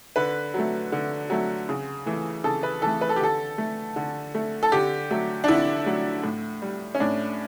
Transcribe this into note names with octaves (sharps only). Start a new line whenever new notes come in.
D3 B4
F#3 A3
D3
F#3 A3
C#3
E3 A3
C#3 A4
B4
E3 A3 A4
B4
A4
G4
D3 A4
A3
D3
A3
A4
D3 G4
F#3 A3
D4
D3 E4
F#3 A3
A2
G3
C#4
A2 D4